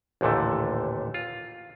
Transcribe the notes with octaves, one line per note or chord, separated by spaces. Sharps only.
A1 D#2 A#2 D3 A3
F4